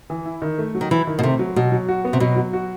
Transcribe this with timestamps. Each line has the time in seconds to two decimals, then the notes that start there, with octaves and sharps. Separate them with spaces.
0.10 E3
0.26 E4
0.42 D#3
0.58 A3
0.75 F#3
0.81 D#3
0.91 E3 E4
1.07 D#3
1.19 B2
1.23 C3 A3
1.39 F#3
1.56 B2 F#3
1.72 F#3
1.88 F#4
2.05 B3
2.13 C3
2.20 B2 F#3
2.37 F#3
2.53 F#4